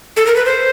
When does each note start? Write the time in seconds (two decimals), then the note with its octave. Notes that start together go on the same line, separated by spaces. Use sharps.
0.17 A4
0.27 A#4
0.36 B4
0.46 C5